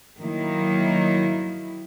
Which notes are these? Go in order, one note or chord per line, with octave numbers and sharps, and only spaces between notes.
D#3 F#3 A#3 E4